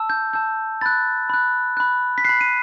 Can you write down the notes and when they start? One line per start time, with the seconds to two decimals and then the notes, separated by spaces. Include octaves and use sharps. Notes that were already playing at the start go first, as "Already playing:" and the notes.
Already playing: A5 E6
0.10 G6
0.33 A5 E6 G6
0.81 B5 F#6 A6
1.30 B5 F#6
1.77 B5 F#6
2.18 B6
2.25 B5 F#6 C7
2.41 D#7